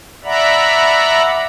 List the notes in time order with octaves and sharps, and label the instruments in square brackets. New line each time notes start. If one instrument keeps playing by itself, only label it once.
[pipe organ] D5 E5 F#5 A#5 B5